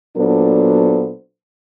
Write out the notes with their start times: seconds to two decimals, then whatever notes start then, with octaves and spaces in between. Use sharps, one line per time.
0.18 A#2 F#3 B3 D4 A4 C5